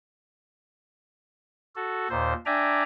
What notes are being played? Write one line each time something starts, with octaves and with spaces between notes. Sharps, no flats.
F#4 A4
D#2 A#2 C5
D4 D5 E5 G5 G#5 A#5